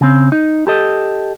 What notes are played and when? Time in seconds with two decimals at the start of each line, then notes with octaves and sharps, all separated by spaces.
0.01 C#3 C4
0.32 D#4
0.67 G4 A4 D#5